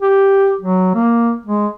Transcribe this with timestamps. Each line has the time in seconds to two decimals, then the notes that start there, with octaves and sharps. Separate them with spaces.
0.02 G4
0.61 F#3
0.95 A#3
1.45 G#3